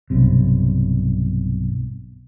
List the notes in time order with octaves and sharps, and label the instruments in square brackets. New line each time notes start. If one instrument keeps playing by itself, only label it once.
[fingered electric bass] B1 G2 C3